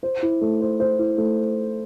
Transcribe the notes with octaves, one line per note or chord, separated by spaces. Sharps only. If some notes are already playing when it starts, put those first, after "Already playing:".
C5
E4
A3
C5
C5
E4
A3